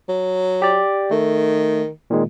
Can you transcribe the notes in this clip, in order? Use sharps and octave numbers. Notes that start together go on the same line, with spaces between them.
F#3
G4 D5
D#3 A3
A#2 D#3 G#3